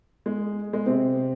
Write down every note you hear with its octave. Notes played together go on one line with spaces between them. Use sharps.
G#3
G#3
C3 C4